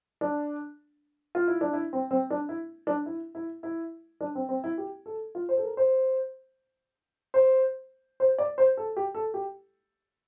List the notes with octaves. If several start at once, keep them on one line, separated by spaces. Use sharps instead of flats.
D4
F4
E4
D4
E4
C4
C4
D4
E4
D4
E4
E4
E4
D4
C4
C4
E4
G4
A4
F4
C5
A4
A#4
C5
C5
C5
D5
C5
A4
G4
A4
G4